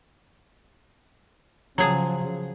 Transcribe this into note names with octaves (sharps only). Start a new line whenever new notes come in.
C#3 F3 F#3 G#4 A5